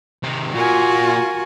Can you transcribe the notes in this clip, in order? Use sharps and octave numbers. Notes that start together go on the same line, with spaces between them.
C3 D#3
A#2 F4 F#4 A#4 G#5